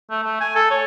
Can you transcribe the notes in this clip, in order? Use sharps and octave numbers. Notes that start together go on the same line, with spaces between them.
A3
A3
G#5
A4
C#5